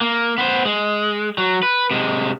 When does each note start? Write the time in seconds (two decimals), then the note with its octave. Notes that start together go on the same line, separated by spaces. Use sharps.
0.01 A#3
0.38 B3 C5
0.65 G#3
1.38 F#3
1.63 B4
1.91 C3 G#3